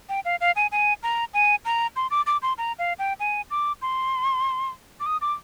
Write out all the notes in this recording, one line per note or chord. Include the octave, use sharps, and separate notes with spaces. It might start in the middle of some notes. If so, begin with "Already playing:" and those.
G5
F5
F5
G#5
G#5
A#5
G#5
A#5
C6
D6
D6
C6
A#5
F5
G5
G#5
D6
C6
D6
D#6
D6